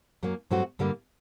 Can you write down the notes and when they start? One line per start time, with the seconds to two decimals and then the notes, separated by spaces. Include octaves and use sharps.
0.23 F#2 F#3 A#3
0.51 G2 F#3 A3 C4 F#4
0.79 G2 D3 G3 A#3